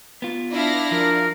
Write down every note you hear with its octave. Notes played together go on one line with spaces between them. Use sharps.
B3 F4
D4 E4 D5 F5 A#6
F3 A#4